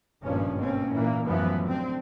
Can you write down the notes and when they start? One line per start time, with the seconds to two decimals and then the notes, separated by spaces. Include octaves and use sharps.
0.23 G#1 G2 A#2 F3 A#3 C#4
0.57 B2 A#3 C4 C#4
0.92 A#2 E3 A#3
1.26 F#2 A2 E3 F3 B3
1.67 D3 C4